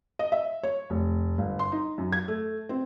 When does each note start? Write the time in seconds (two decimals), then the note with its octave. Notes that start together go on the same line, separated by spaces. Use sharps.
0.19 D#5
0.32 E5
0.63 C#5
0.90 F1
1.38 G1
1.59 C6
1.72 D#4
1.98 F#2
2.12 G#6
2.28 A3
2.69 C4